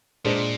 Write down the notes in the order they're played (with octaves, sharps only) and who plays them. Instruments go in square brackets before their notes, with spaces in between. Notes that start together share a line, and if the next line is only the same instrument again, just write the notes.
[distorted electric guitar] A#2 [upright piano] G#3 D4 G#4 C5